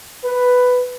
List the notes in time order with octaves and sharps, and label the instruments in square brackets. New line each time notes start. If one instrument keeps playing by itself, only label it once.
[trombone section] B4